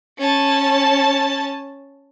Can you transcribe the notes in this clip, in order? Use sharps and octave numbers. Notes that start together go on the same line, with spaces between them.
C#4 A5